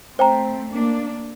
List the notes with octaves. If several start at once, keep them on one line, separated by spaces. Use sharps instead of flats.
A3 C4 C5 G5 A#5
A#3 D4